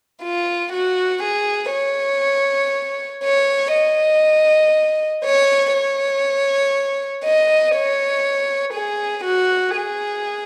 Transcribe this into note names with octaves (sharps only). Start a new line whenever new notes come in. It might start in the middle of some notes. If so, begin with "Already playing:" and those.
F4
F#4
G#4
C#5
C#5
D#5
C#5
C#5
D#5
C#5
G#4
F#4
G#4